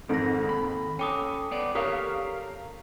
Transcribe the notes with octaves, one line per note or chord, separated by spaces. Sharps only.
F2 G#2 D#3 A4 A#6
D#2 B5
C#4 A4 G5 D6 D#6
B3 D5
G4 A4 A#4 C#5 F5 D#6